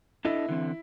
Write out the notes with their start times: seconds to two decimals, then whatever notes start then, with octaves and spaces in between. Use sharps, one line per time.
0.25 D4 E4 A4 D#5
0.49 D3 E3 C4